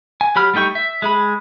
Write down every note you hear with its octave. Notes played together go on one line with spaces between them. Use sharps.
G#5
F#3 G4 B5 F6
G3 A3 D#4 G5 C#6
E5
G#3 G#4 B5